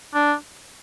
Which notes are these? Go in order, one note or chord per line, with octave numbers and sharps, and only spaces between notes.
D4